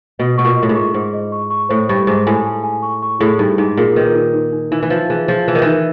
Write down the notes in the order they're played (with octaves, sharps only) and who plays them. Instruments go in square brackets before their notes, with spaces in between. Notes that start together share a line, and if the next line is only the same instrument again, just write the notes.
[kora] B2 [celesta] D#5
[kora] B2 [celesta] C#6
[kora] A#2
[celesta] D#5
[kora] A2
G#2
[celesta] C#6
[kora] G#2 [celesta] C5
[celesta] D#5
C#6
C#6
[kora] A2 [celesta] C5
[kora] G2 [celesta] C#6
[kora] G#2 [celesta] C5
[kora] A2 [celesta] G#5
[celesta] G#5
G#5
C#6
C#6
[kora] A2 [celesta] G#4
[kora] G2 [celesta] D#4
[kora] G#2 [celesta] D#4
[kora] A#2 [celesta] G#4
[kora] D#3 [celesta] B4
[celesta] D#4
D#4
D#4
[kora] E3 [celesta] D#4
[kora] E3
[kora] F3 [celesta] B4
[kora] E3 [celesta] G#4
[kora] F3 [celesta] G#4
[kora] E3 [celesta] B4
[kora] D#3
[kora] E3 [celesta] D#4